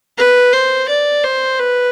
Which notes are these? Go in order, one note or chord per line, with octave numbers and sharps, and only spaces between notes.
B4
C5
D5
C5
B4